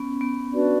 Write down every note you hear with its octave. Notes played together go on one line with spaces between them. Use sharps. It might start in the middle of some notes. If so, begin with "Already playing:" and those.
Already playing: B3 C#4
B3
D4 F#4 B4 D5